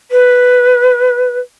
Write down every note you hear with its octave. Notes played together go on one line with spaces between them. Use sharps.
B4